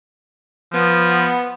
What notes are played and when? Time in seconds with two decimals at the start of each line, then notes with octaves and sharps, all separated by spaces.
0.72 F3 B3